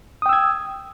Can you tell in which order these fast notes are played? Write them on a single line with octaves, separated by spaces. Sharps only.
D#6 G5 E6 G#6